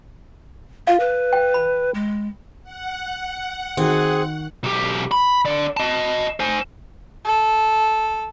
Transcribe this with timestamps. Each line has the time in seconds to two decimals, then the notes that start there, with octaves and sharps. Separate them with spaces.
0.87 F4 F5
1.00 B4
1.33 G5
1.54 B5
1.94 G#3
2.64 F#5
3.77 D#3 C4 F#4 G#4
4.63 B1 G4
5.11 B5
5.46 D3 D5
5.77 D#5 A5
6.40 C5 G#5
7.25 A4